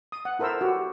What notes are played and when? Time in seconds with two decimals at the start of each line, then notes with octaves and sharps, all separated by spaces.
0.12 D#6
0.25 F#5
0.39 E4 A4 A#4 C5 E5 E6
0.61 F#4 G4